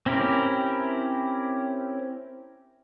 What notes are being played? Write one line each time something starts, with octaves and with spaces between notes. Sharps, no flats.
C4 C#4 E4 G4 A#4